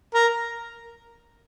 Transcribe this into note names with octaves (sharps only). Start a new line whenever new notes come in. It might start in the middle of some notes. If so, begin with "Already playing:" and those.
A#4